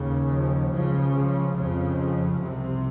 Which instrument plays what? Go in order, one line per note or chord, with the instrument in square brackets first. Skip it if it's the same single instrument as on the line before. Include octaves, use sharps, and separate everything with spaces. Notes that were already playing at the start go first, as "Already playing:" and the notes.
Already playing: [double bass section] D#2 C#3
F3
C#2 C#3 F3
F3
F2 C#3 F3
C2 C3